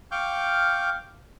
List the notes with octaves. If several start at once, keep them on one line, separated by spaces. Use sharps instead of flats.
F5 G5 C#6 D6 F6 G6